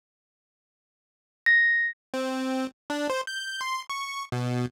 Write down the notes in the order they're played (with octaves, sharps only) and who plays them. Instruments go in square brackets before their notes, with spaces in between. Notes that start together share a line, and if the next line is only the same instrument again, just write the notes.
[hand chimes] A#6
[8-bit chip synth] C4
D4
C5
G6
C6
C#6
B2